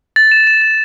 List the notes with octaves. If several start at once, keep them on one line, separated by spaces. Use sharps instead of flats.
A6
E7
E7
A6